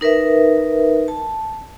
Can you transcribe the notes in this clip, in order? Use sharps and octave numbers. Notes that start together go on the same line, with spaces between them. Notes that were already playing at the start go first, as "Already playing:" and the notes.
D#4 A#4 B4 E5
A5